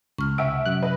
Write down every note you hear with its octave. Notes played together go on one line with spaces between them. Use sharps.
C#2 C#6 F6
C3 E5 F#5 D7
F#2 F#6
B4 D#5